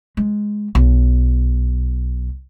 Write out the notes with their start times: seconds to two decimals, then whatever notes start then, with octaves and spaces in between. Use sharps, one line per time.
0.17 G#3
0.75 B1